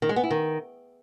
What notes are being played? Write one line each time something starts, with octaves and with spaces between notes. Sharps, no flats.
D#3
G#3
B3
E4
D#3